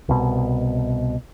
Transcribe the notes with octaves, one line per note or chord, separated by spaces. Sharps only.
C2 B2